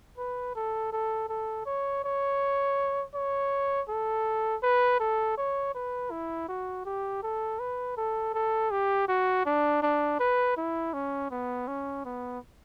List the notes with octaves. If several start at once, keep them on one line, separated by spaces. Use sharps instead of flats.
B4
A4
A4
A4
C#5
C#5
C#5
A4
B4
A4
C#5
B4
E4
F#4
G4
A4
B4
A4
A4
G4
F#4
D4
D4
B4
E4
C#4
B3
C#4
B3